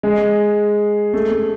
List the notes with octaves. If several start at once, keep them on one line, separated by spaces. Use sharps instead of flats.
G#3
A3
A3